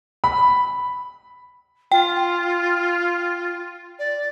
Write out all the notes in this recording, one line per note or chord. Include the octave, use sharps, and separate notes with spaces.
B5
F4 G5
D5